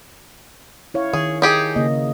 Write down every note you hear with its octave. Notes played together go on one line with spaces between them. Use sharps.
E4 C#5 F5
D#3 G#4
D#4 G4 G#4
C#3 A#3 D#5